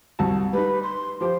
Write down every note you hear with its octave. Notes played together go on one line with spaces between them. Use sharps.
C2 F#4 A5
G3 D#4 B4
C6
F3 G4 C5